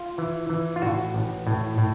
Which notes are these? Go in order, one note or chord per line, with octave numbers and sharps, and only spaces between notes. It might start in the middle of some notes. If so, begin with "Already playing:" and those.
Already playing: F4
E3
E3
F4
A2 F#4
A1
A2
A2